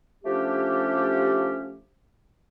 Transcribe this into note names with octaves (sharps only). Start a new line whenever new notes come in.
F3 A3 C#4 D4 G4